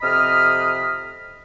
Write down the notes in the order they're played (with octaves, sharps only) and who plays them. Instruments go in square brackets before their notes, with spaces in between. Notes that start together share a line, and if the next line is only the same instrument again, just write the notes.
[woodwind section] F2 C3 D#5 B5 D#6 F6